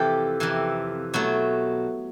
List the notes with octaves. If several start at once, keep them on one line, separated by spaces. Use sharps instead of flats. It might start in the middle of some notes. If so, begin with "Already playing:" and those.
Already playing: F2 C3 E3 G4 A4
F2 C3 E3
B2 F#3 A3